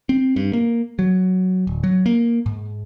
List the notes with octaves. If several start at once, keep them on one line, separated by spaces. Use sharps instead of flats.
C4
G2
A#3
F#3
D1
F#3
A#3
G#2